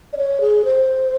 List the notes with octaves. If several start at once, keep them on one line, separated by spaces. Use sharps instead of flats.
D5
C#5
G#4
C5